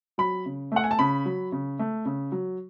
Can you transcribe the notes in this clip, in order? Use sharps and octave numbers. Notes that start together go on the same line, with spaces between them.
F#3 B5
C#3
A3 F#5
G#5
A5
C#3 B5
F#3
C#3
A3
C#3
F#3